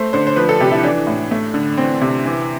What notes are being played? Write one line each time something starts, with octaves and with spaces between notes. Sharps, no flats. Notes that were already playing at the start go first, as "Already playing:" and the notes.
Already playing: A3 C5
D3 C5
C5
F3 B4
A4
C3 G4
E4
E3 D4
A2
A3
D3
E3 C4
C3
E3